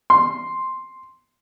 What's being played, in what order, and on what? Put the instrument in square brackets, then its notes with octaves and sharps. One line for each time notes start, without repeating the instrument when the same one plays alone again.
[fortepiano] C6